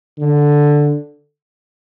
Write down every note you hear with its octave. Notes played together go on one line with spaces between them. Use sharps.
D3